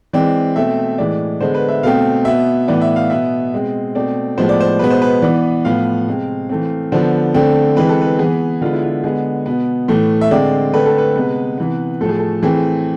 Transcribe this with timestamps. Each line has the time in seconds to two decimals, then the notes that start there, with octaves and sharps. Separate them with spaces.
0.13 E3 G#3 C4 D5
0.56 B2 A3 C4 E5
0.98 A2 E3 G#3 D5
1.41 D3 G#3 B3 C5
1.55 B4
1.68 E5
1.83 B2 A3 C4 F5
2.25 B2 B3 E5
2.68 A2 E3 B3 D5
2.82 E5
2.96 F5
3.10 B2 B3 E5
3.53 B2 G#3 C4
3.95 B2 A3 C4 D5
4.37 A2 F3 G#3 B3 C5
4.49 D5
4.61 C5
4.79 B2 G#3 B3 B4
4.91 C5
5.02 B4
5.22 E3 B3 D5
5.65 A2 F3 B3 F5
6.07 C3 G#3 C4
6.49 E3 A3 C4
6.92 D3 F3 B3 C5
7.34 D3 A3 C4
7.76 E3 G#3 C4 B4
7.89 A4
8.02 B4
8.19 E3 B3 G#4
8.61 D3 G#3 B3 F4
8.73 E4
8.83 F4
9.04 D3 G#3 B3 G#4
9.46 B2 B3
9.88 A2 E3 A3
10.21 E5
10.31 D3 G#3 C4 D5
10.73 D3 A3 C4 B4
10.86 A4
10.98 B4
11.16 C3 G#3 B3
11.58 C3 E3 B3
12.01 A2 F3 A3 A4
12.09 G#4
12.19 A4
12.43 E3 A3 C4 G#4